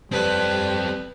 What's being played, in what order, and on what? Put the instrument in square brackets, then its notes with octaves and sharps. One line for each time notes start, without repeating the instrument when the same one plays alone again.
[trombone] G3 [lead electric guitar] C4 A4 [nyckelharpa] B4